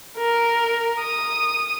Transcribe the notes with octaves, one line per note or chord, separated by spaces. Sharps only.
A#4
D#6